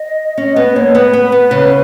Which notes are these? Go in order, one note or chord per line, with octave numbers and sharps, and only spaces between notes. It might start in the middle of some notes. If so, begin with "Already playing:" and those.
Already playing: D#5
C#4 D#5
B3 B4
A#3 C#5
B3 B4
B3
B3
C#3